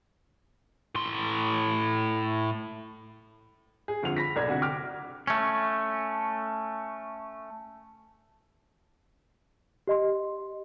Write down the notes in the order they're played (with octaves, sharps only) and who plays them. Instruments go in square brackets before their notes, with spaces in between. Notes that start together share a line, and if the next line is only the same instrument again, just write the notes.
[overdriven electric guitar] A2 C6
[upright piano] G#4
G1 F2 F4 F#5 F7
B5 A#6 B6
B1 D5 G#6
D2 C3 F#4
G5 D6 F6
[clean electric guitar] A3 C#4
[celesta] G4 D#5 C6